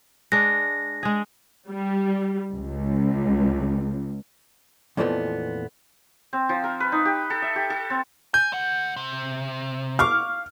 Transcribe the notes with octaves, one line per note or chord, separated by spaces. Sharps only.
G#3 D4 A#6
G#3 G#4
G3
C#2
F2 A#2 E3 F3 A3 B3
C4
F3
A#4
B4
D#4
G4
A4
E5
G4
A4
C4
G#5 G6
D2 F#5
C3
F5 C#6 D6 F6